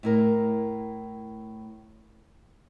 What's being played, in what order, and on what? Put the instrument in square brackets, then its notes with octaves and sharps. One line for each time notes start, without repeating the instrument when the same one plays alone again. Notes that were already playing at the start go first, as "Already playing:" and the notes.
[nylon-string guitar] A2 E4 A#4